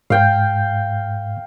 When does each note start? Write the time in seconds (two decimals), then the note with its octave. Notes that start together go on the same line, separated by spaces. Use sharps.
0.10 G#2 F5 G5 G6